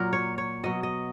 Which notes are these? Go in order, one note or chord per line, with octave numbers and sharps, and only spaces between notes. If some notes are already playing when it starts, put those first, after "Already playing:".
Already playing: A#2 F#3 A#4
C#5
C#5
B2 F#3 D#5
D#5